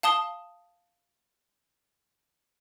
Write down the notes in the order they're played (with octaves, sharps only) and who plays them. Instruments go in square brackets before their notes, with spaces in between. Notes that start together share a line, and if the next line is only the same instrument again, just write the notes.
[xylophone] F5 A5 D#6 G7